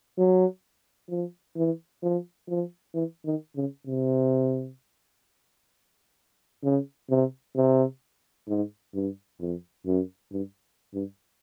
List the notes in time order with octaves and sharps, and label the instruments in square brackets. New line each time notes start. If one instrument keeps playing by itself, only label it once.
[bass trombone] F#3
F3
E3
F3
F3
E3
D#3
C#3
C3
C#3
C3
C3
G#2
G2
F2
F#2
G2
G2